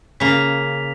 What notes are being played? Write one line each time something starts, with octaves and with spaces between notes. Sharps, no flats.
C#3 A#3 B6 F7